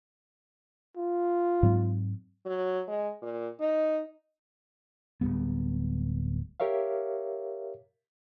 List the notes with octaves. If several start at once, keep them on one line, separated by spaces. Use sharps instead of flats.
F4
G#2 F#3 C4
F#3
G#3
A#2
D#4
D1 C#2 G3 B3
G4 A#4 C#5 E5 F5